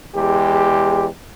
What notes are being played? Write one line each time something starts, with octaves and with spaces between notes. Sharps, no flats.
E2 G#3 G4